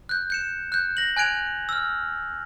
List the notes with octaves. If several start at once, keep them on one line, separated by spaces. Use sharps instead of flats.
F#6 G6
G6 C#7 E7
F#6 G6
A#6 F#7
G#5 F#6 G#6 D7 F7
E6 F6